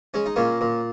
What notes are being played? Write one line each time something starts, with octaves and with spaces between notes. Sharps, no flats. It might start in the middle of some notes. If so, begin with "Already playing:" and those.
G#3 C#4
D#4
A#2 A#3 C#4
A#2